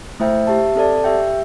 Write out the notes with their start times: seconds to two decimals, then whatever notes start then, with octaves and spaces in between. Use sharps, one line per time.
0.20 A3 E4 C5 E5 G5
0.47 G4 E5 A5
0.75 C4 A4 D5 A5
1.04 G4 E5 G5